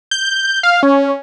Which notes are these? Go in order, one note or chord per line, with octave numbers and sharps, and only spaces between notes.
G6
F5
C#4